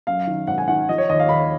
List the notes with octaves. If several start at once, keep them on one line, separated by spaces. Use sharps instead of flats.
F#2 F5
D#3
G#1 F#5
G#5
D#3 F#5
F3 D#5
C#5
D#2 D#5
F5
D#2 B5